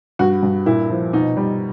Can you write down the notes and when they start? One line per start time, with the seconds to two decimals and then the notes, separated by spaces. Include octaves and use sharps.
0.19 G2 F#4
0.43 G2
0.66 A#2 E4
0.90 F3
1.13 B2 D#4
1.37 G3